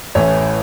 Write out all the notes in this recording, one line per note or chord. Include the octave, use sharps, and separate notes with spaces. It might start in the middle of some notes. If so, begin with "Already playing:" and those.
A1 A2 E3 C#5